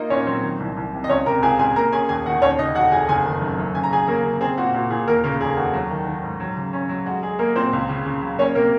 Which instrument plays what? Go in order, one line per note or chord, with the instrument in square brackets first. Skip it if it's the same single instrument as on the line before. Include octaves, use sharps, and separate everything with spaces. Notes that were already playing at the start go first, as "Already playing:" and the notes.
Already playing: [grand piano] A#3 D#4 F4 D#5
A#2 C#4 C#5
F#3 C4 C5
D#3
C2
C2
C3
D#5
C#2 C#4 C#5
C3 A#4 A#5
C#2 G#4 G#5
C#2 G#4 G#5
A#3 A#4 A#5
C#4 G#4 G#5
D#2 G#4 G#5
D#3 F#4 F#5
D#2 C#4 C#5
C#3 D#4 D#5
F1 F#4 F#5
F1 G#4 G#5
F#1 G#4 G#5
D#3
F#2
F#2
C#3 G#5
A#5
C#3 G#4 G#5
F#3 A#3 A#4
C#3
C4 G#4
A#2 F#4
A#2 F#4
A#2 G#4
D#2 A#3 A#4
C#3 A#3 A#4
F1 G#4
D#2 F#4
F#3
D#3
D#3
G#2
F#3
C#3
C#4
F#3
G#3 F#4
G#3 G#4
G#3 A#3 A#4
A#2 C4 C5
C#2
C#3
C#3
F#3
A#3 C#4 C#5
C3 A#3 A#4